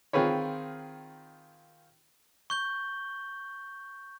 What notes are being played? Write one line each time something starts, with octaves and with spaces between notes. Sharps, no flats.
D#3 C4 F4 G#4 B4 C#5
C#6 G6 G7